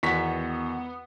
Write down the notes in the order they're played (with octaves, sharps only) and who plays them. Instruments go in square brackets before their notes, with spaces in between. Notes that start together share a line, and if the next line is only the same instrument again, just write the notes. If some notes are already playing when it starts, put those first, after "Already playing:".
[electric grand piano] E2 C#6 B6 [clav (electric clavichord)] D#3 F#4 [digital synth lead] B3